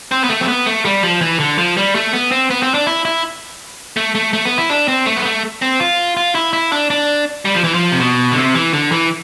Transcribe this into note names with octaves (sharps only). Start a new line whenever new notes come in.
C4
B3
A3
C4
B3
A3
G3
F3
E3
D3
F3
G3
A3
B3
C4
B3
C4
D4
E4
E4
A3
A3
A3
B3
E4
D4
C4
A3
B3
A3
C4
F4
F4
E4
E4
D4
D4
G3
F3
E3
F3
C3
B2
D3
C3
E3
D3
E3